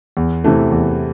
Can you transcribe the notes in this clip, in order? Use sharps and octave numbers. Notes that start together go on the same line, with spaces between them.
E2
C3 E3 A3
E2